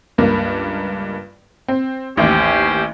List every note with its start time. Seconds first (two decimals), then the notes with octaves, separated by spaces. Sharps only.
0.18 C#2 G2 A#3
1.68 C4
2.17 A1 D#2 C#4 G4 C5